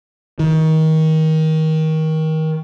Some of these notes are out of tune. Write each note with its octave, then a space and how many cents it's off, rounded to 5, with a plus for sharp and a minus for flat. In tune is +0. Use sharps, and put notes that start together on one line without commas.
D#3 +25